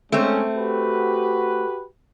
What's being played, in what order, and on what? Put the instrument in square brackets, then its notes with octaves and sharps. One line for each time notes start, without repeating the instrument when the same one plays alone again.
[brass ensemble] G#3 C#4 [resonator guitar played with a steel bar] A3 C4
[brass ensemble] F#4 G4 B4